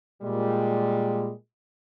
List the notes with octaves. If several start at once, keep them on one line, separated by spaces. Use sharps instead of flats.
A#2 G3 G#3